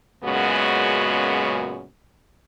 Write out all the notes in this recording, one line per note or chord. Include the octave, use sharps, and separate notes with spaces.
F#2 A#2 C#3 G#3 B3 F#4